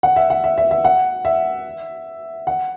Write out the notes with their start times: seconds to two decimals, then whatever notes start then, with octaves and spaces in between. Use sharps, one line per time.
0.03 F#5
0.16 E5
0.30 F#5
0.44 E5
0.58 E5
0.71 E5
0.85 F#5
1.25 E5
2.47 F#5